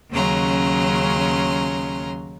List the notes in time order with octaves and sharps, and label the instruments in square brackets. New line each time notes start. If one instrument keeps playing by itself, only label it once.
[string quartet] D#2 C#3 F#3 C#4 A#5 C6